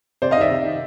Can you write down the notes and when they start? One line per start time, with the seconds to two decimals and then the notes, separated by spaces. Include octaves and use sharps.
0.22 C3 C5 D5
0.31 D#5 F5
0.37 D#3 D5 E5
0.51 C3
0.66 D#3